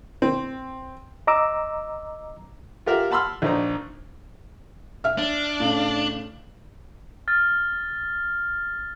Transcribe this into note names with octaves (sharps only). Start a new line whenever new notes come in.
C4
D#5 A#5 D6 E6
F4 G4 A#4 E5 F#5
F#5 A5 B5 C6 E6 F6
A#1 D#4 C5 A#5
E5 F6
D4
A2 C#3 F5
F6 A6